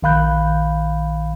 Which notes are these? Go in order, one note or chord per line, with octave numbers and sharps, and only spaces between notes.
A#1 D#3 F5 B5 F#6 G6